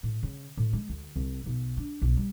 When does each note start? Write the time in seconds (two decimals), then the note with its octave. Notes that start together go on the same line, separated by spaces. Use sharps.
0.03 A2
0.23 C#3
0.57 A2
0.73 G#3
0.89 D2
1.16 C2
1.46 B1
1.77 D4
2.02 B1
2.17 G3